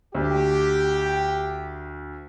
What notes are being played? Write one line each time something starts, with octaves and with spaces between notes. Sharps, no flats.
D2 G4